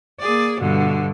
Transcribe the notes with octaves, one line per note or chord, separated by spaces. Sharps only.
A#3 G#4 D5
G2 B2 D3